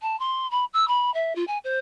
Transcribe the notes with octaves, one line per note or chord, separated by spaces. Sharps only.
A5
C6
B5
E6
B5
E5
F4
G#5
C5